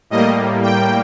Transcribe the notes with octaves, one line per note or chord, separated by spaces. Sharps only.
A2 G3 A#3 D#5
G5